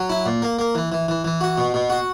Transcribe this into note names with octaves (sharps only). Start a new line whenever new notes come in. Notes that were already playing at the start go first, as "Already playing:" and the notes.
Already playing: F#3
E4
A#2
A#3
A#3
E3
E3
E3
E3
F#4
B2
B2
F#4